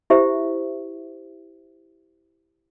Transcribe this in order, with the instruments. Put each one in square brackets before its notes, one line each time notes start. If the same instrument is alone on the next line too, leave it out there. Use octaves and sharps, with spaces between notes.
[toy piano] E4 G4 C5 E5